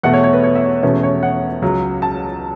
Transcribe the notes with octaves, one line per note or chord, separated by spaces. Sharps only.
E2 B2 A3 F#5
C#5
C#5
B4
C#5
E5
C#5
E1 E2 B2 A3 C#4 B4
C#5
F#5
C#2 C#3 F#3
A5